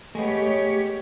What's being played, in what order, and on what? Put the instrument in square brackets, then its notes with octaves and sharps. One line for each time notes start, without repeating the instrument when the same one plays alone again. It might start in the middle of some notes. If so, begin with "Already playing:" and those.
[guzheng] G#3 B3 [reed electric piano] A3 [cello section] G4 C#5